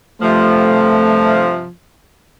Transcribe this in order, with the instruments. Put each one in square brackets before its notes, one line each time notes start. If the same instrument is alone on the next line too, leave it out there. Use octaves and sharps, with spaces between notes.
[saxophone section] G2 C3 F3 [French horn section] A3